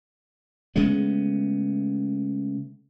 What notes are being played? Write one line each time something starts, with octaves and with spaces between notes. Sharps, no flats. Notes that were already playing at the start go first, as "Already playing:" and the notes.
C#3 G#3 A3 B3